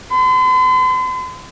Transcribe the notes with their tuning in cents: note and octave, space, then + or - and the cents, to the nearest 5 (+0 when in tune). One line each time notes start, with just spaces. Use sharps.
C6 -45